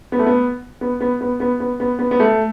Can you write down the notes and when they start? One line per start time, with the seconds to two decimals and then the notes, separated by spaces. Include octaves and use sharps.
0.12 B3
0.19 A3
0.26 B3
0.81 B3
1.00 B3
1.21 B3
1.40 B3
1.60 B3
1.80 B3
1.99 B3
2.11 B3
2.20 A3